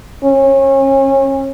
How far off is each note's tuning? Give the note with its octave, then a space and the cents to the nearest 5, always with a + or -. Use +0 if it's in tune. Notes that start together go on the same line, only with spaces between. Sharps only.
C#4 -30